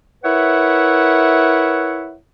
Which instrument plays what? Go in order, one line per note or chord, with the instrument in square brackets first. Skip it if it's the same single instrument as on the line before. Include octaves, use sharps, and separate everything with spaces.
[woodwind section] E4 A#4 B4 C#5 E5 F#5